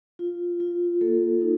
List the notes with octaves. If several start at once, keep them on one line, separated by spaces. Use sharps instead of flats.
F4
F4
A#3 A4
D#4